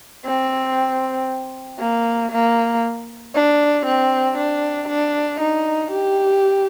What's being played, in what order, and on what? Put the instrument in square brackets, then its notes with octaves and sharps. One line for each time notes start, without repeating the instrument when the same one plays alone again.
[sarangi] C4
A#3
A#3
D4
C4
D4
D4
D#4
G4